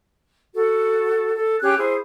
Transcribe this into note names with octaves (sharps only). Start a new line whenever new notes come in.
F#4 A4
A4
C#4 G4 G#4 F#6
E4 G#4 C5